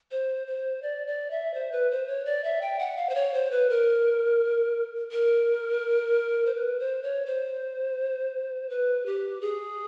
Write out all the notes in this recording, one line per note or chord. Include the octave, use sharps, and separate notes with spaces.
C5
C5
D5
D5
E5
C5
B4
C5
C#5
D5
E5
G5
F#5
F5
C5
C#5
C5
B4
A#4
A#4
C5
B4
C5
C#5
C5
B4
G4
G#4